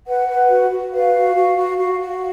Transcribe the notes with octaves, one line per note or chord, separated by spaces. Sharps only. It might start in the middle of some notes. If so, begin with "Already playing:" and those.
B4 F#5
B4
F#4
F#4
B4 F5
F#4
F#4
F#4
F#4
F#4